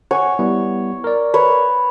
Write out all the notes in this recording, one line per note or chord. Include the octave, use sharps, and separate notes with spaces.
C#5 F#5 G#5 C#6
G3 B3 E4
A#4 D5
B4 C#5